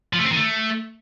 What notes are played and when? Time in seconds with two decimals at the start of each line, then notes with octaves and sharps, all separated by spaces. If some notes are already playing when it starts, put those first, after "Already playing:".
0.13 F3
0.19 A3
0.25 C4
0.30 D#3
0.36 A3